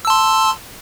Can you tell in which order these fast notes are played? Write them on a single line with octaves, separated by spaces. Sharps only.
E6 A5 C6